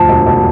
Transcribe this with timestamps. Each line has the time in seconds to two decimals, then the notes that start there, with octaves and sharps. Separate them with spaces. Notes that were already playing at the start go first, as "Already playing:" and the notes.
Already playing: D2 F3 A5
0.09 E1
0.26 E1